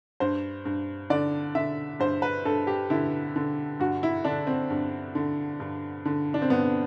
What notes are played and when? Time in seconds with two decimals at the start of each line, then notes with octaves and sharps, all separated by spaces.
0.20 G2 C5
0.65 G2
1.10 D3 D5
1.55 D3 E5
2.00 G2 C5
2.22 B4
2.45 G2 A4
2.67 G4
2.90 D3 E4
3.36 D3
3.80 G2 F#4
4.03 E4
4.24 D3 D4
4.47 C4
4.70 G2
5.15 D3
5.60 G2
6.05 D3
6.34 D4
6.42 C4
6.50 G2 B3